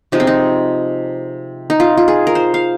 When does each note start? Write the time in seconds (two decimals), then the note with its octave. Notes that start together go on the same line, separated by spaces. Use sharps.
0.12 C3 F3 G#3 D#4
0.20 C4
0.27 D#4
1.70 D#4
1.80 F4
1.97 F4
2.08 G#4
2.27 A#4
2.35 C5
2.54 F5